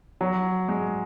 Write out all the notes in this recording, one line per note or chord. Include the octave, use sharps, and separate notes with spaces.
F#3
G#3